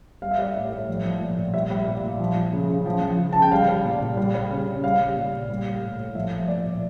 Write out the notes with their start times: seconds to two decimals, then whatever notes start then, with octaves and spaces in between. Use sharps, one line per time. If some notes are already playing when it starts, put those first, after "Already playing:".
0.22 G3 F5
0.31 E5
0.38 G3 D5
0.50 A2 E5
0.71 A2
0.88 F3
1.04 F3
1.21 A#2
1.37 A#2
1.54 G3 E5
1.70 G3
1.87 A#2
2.03 A#2
2.20 F3
2.36 F3
2.53 C#3
2.69 C#3
2.86 F3
3.02 F3
3.19 C#3
3.33 C#3 A5
3.42 G5
3.52 G3 F5
3.68 G3
3.85 A#2
4.01 A#2
4.17 G3
4.34 G3
4.50 C#3
4.67 C#3
4.83 G3 F5
5.00 G3
5.17 A#2
5.33 A#2
5.49 G3
5.66 G3
5.82 A2
5.99 A2
6.15 F3 E5
6.32 F3
6.48 A#2 D5
6.65 A#2